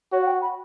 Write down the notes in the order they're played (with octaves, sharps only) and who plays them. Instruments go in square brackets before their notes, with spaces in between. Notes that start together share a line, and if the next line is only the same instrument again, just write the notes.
[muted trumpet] F#4 [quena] C#5
[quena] F#5
G5
B5